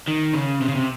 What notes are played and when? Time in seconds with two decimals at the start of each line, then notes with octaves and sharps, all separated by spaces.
0.08 D#3
0.34 C#3
0.61 C3
0.68 C#3
0.75 C3